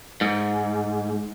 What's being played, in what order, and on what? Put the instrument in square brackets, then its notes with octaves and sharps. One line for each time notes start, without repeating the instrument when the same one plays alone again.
[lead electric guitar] G#2